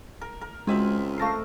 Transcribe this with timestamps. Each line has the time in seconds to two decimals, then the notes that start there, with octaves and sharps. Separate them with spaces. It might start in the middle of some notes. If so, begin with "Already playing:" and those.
0.21 A#4
0.41 A#4
0.67 C#2 G#3 C4 F#4 D#5 E5
1.18 A3 A4 A#4 F5 A#6 C7